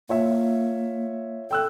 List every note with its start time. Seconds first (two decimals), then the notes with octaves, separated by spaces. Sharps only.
0.09 A#3 F4 C#5 E5
1.51 A4 G5 E6 F#6